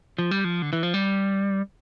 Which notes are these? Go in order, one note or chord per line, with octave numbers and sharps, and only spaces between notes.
F3
G3
F3
D3
E3
F3
G3